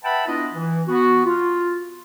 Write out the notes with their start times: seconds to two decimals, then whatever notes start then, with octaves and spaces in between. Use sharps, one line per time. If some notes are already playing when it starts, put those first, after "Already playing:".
0.04 B4 E5 F#5 G5 A5 B5
0.27 B3 D4 E4 F4 D#5
0.53 E3
0.88 B3 F#4
1.25 F4